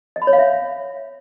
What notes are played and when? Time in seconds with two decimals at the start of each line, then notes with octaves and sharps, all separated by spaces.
0.16 D#5
0.22 B5
0.27 C#5
0.33 F5
0.38 E5